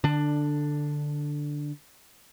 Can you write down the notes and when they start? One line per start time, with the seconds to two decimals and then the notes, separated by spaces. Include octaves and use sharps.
0.04 D3 D4